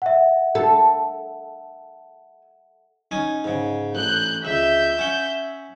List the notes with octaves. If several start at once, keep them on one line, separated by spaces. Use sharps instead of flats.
E5 F#5
A4
C#4 D#4 G#5
G#2 C#3
A1 F#6 G6
C#2 E5 G6
C#4 F#5